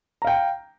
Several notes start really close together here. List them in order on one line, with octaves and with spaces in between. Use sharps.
A#5 F5 G5